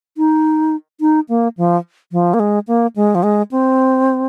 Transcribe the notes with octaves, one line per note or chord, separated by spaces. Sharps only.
D#4
D#4
A#3
F3
F3
A#3
G#3
A#3
G#3
F3
G#3
C4